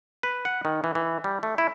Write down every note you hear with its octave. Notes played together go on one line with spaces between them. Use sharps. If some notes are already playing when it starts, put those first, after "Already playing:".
B4
F#5
D#3
E3
E3
G3
A3
E4